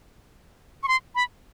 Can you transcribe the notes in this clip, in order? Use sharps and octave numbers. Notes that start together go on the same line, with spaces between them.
C#6
C6
B5